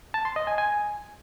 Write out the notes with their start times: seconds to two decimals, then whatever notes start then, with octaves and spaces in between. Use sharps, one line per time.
0.14 A5
0.25 C6
0.36 D#5
0.47 G#5
0.58 G#5